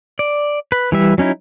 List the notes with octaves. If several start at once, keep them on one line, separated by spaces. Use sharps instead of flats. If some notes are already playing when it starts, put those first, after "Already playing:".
D5
B4
E3 G3 E5
F#3 C#4 D#4 E4